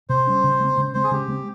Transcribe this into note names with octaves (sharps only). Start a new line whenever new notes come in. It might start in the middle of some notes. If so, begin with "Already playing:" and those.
C3 C5
G3 C#4
C#3
G#3 C4
C#3
G#3 C4 C5
G#4
C#3 G4
G#3 C4